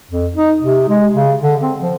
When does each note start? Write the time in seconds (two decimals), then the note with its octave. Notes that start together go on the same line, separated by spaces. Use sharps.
0.10 F2
0.36 D#4
0.60 C3
0.89 G#3
1.13 C#3
1.41 D3
1.62 C4
1.79 F3